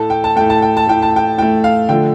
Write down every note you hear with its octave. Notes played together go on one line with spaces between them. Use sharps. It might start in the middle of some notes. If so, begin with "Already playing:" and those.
Already playing: A2 A3 A4 A5
G5
A5
A2 A3 G5
A5
G5
A5
A2 A3 G5
A5
G5
A2 A3 G5
F5
D3 F3 A3 G5